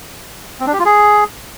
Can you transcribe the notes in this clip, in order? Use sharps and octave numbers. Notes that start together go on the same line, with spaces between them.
C4
D4
G4
F4
G#4